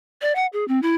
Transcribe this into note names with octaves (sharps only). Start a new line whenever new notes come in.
D5
F#5
G#4
C4
E4